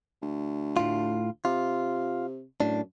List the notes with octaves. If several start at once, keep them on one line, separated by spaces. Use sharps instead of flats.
D2
A2 F4
C3 F4
F#2 A2 D4